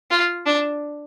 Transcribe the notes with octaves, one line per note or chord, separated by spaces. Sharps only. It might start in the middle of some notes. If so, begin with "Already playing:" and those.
F4
D4